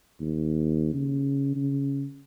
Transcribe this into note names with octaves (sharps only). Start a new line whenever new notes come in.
D#2
C#3
C#3